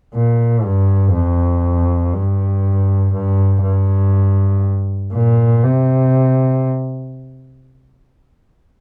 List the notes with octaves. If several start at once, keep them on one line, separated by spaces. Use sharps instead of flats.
A#2
G2
F2
G2
G2
G2
A#2
C3